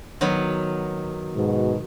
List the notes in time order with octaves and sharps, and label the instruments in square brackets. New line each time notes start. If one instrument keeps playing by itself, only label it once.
[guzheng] D#3 F#3 B3
[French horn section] G#2 B2